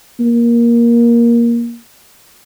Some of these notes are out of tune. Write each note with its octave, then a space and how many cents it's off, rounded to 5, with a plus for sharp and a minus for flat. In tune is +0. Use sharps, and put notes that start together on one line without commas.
A#3 +15